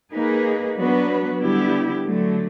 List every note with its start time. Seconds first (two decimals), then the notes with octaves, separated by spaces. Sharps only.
0.14 A#3 D#4 G#4 B4
0.77 F#3 B3 D4 F#4 B4
1.41 D3 G3 B3 E4 G4
2.04 D3 F#3 A3